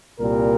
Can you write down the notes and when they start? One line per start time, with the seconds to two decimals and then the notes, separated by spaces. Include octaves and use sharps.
0.18 C2 A#2 G3 A#4